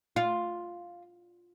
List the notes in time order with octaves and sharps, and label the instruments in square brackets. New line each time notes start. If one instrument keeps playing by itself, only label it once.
[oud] F4